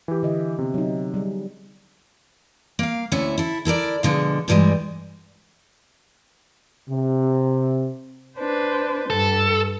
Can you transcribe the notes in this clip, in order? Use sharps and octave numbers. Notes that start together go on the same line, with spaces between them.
E3 G4
D3 D#5 E5
C3 B3
F#3 D#4
G3 G#4
A#3 F5
D2 A3 C#4 E4 E5
E4 A4
E4 A4 A#4 D5
B2 D3 F3 G#3
G2 E3 F3 G3 G#3
C3
D4 B4 C5
G2 A4